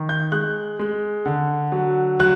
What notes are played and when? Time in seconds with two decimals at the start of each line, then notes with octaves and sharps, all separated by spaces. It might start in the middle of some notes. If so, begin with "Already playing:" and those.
Already playing: D#3
0.09 G6
0.32 G#3 F#6
0.79 G#3
1.26 D3
1.72 F#3
2.20 F#3 F#6